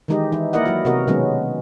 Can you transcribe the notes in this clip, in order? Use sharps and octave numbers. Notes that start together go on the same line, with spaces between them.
D#3 E3 G#3 D#4 G4 D#5
E3 D#4 E4
A#3 E4 A#4 D5 D#5 F#5
F#3 E4 F#4
C3 B3 F#4 A#4 D#5
B2 D#3 F#3 G#3 B3 C#4